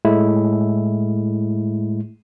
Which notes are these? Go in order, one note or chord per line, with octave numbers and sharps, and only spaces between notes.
A2 G#3 A3 E4